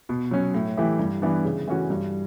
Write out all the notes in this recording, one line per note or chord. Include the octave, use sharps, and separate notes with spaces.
B2
F#3 C#4
A2
E3 A3 E4 G4
G2
E3 B3 D4
C#3
E3 A3 C#4 F#4
G2